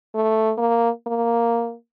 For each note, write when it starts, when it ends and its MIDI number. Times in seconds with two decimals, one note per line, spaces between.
0.15 0.52 57
0.57 0.89 58
1.07 1.74 58